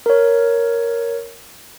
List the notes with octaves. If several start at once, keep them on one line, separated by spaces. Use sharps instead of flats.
A#4 C#5